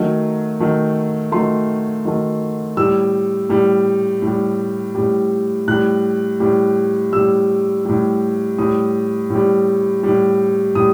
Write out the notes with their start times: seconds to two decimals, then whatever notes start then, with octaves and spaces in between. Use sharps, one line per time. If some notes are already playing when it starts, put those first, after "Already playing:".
Already playing: D#3 F#3 A3
0.60 D#3 F#3 A3
1.32 D#3 F#3 A3 C6
2.05 D#3 F#3 A3
2.77 A2 G3 E6
3.49 A2 G3
4.22 A2
4.27 G3
4.95 A2 G3
5.68 A2 G3 F#6
6.40 A2 G3
7.13 A2 G3 E6
7.85 A2 G3
8.59 A2 G3 D#6
9.30 A2 G3
10.03 A2 G3
10.75 A2 G3 D#6